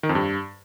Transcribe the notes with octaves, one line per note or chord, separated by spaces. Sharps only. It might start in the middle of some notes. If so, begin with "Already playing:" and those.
D#3
F2
G2